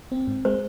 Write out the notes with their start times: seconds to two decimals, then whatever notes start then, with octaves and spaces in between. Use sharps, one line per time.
0.12 C4
0.27 G#2
0.45 G#3 C5